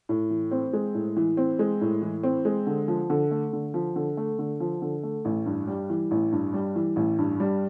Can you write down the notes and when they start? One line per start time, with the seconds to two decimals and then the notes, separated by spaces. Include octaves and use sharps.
0.09 A2
0.30 E3
0.51 C4
0.73 G#3
0.94 A2
1.17 E3
1.37 C4
1.59 G#3
1.81 A2
2.02 E3
2.23 C4
2.45 G#3
2.67 D3
2.88 F3
3.10 D3
3.31 A3
3.53 D3
3.74 F3
3.96 D3
4.17 A3
4.39 D3
4.60 F3
4.82 D3
5.03 A3
5.25 A1
5.46 G2
5.68 G3
5.90 E3
6.11 A1
6.32 G2
6.54 G3
6.76 E3
6.96 A1
7.19 G2
7.40 G3